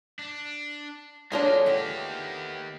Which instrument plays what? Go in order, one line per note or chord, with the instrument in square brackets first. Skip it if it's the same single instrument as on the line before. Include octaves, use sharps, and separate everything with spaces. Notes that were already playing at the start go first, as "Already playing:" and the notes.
[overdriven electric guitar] D4
[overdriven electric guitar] F#3 A#3 [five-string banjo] D4 F4 G#4 [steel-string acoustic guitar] A4 C#5
[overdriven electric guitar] D#3 G4 [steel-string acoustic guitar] A3 B3